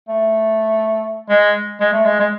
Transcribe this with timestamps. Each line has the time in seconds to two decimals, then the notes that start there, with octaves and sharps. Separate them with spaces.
0.09 A3
1.30 G#3
1.81 G#3
1.93 A3
2.06 G#3
2.20 G#3